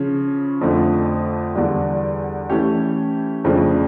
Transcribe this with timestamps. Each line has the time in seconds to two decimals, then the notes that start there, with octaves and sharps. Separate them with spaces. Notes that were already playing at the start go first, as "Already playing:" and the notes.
Already playing: C#3 F3 C#4
0.61 F2 D3 F3 A3
1.55 E2 D3 G3 D4
2.50 E3 A3 C#4 G4
3.44 F2 C#3 F3 A3 D4